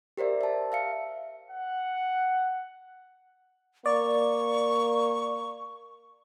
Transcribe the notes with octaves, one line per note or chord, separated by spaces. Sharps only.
G4 A#4 C5 D5 E5
E5 A5
E5 F5 C#7
F#5
A#3 D5 C#6